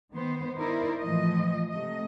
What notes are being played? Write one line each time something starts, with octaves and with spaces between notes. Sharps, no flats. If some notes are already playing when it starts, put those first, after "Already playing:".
D#3 B3 C5
D#4 E4 A#4 C5 D5
A2 E3 F3 D#5
C3 A3 D#5